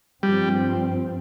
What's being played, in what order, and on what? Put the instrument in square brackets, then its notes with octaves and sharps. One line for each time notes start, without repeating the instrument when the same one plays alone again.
[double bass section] G2 F3 C4 [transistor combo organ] G3